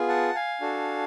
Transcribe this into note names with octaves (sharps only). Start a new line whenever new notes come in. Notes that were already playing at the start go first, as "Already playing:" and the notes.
Already playing: B3 F4 G#4
F#5 A5
F5 G#5
D4 F#4 A4